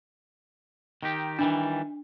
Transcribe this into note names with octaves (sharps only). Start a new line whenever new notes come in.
D#3 D#4 G4
D#3 E3 G3 D4